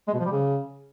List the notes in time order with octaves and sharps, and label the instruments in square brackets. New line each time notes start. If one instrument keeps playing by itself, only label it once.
[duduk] G#3
B2
F3
G3
C#3